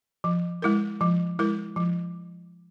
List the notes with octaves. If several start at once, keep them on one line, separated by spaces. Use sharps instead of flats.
F3
G#3 E4 A#4
F3
G#3 E4 A#4
F3